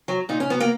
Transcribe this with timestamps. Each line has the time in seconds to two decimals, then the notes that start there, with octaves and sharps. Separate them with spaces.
0.08 F#3
0.29 A#2 D#4
0.40 C#4
0.50 F#3 B3
0.60 A#3